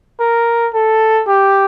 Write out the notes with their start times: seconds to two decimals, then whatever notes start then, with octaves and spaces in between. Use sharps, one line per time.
0.20 A#4
0.74 A4
1.27 G4